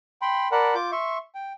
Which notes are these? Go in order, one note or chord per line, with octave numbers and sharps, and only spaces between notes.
G5 B5 C6
A#4 D5 F#5 A5 B5
F4 D6 G6
E5 C6 C#6
G5